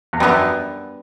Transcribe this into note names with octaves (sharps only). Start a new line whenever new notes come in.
E2
F#2 G3 B3 D4